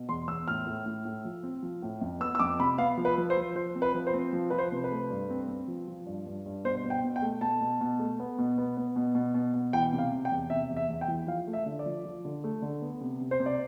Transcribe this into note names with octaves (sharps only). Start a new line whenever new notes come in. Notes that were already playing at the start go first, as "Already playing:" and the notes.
Already playing: B2
E2 C6
E2 E6
A2 F6
A2
A2
A2
F3
C4
F3
A2
F2
B3 E6
E6
F2 D6
C3 B5
B3 F5
F3
B4
F3
C5
F3
F3 C5
C4
B4
F3
C5
C4
F3
F3 B4
C5
C3
B4
A3
G2
C4
C4
F3
F3
G2
G2
G2
B2 C5
B2
G5
B2
G5
A3
B2 A5
B2
B2
A3
B3
B2
B3
B3
B2
B2
B2
B2
E3 G5
C3
F5
C3
G5
E2
C3 E5
E2
E5
E2
G5
E3
F3 F5
A3
E5
D3
D5
F3
F3
D3
A3
D3
B3
C3
C3
C5
C3
D5